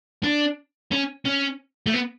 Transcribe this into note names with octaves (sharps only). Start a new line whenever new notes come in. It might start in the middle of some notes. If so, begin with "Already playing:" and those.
D4
C#4
C#4
A3
B3